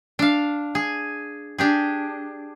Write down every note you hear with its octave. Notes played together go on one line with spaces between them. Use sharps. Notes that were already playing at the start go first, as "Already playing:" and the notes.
D4 F5
G#4
D4 G4 G#4